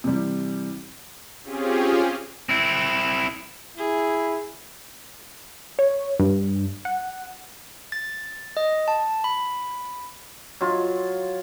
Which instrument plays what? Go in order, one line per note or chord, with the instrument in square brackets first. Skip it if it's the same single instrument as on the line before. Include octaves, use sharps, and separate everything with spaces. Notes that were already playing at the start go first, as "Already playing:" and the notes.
[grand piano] C3 E3 G3
[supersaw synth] C4 C#4 F4 G4 G#4
[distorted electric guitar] C4 E4
[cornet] E4 [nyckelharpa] G#4
[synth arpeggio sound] C#5
G2
F#5
[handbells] A6
D#5
A5
B5
[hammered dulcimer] F#3 F4